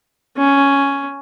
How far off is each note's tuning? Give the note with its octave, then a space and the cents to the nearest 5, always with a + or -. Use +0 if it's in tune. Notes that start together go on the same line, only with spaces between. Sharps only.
C#4 +5